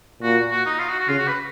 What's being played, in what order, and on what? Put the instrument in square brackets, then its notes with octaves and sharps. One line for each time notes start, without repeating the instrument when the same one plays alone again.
[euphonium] A#2 [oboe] F#4
[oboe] F#4
D#4
F4
F#4
F#4
[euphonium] C#3 [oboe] F4
[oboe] F#4
B4